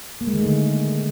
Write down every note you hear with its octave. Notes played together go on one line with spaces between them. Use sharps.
A#3
G#3
D#3
A3
D3